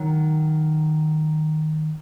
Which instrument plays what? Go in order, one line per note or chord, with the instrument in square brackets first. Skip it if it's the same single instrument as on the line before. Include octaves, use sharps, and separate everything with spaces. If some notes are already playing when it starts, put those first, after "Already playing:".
Already playing: [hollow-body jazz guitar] D#3 F#3